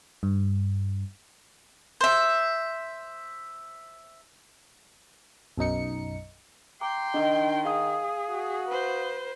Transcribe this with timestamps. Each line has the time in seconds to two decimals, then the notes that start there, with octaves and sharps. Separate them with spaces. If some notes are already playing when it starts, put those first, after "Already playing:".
0.23 G2
2.01 C5 E5
5.58 B1 F#2 D#4 C#7
6.81 G5 A#5 C6 D6
7.14 D#3 D4 D#5
7.65 G#4 F5 D#6
8.30 F#4
8.68 B4 C5